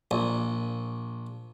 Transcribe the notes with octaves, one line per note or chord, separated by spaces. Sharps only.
A#1